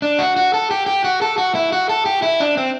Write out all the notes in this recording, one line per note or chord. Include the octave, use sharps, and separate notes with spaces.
D4
F#4
F#4
A4
G4
G4
F#4
A4
F#4
E4
F#4
A4
G4
E4
D4
C4